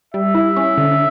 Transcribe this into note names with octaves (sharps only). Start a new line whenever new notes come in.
G3 E5
E4
C#4
D3